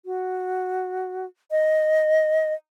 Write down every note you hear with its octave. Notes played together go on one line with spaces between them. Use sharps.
F#4
D#5